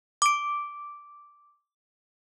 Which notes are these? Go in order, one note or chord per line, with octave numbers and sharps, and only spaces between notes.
D6 D7